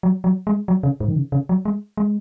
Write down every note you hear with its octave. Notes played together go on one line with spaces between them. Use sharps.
F#3
F#3
G#3
F#3
C#3
G#2
D#3
C#3
C#3
F#3
G#3
G#3